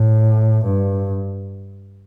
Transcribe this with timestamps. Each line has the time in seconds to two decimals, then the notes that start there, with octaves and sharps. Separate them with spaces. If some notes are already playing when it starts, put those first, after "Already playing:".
Already playing: A2
0.65 G2